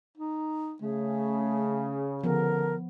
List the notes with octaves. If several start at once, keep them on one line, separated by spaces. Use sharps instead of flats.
D#4
C#3 A3 G#4
D3 F3 B3 A#4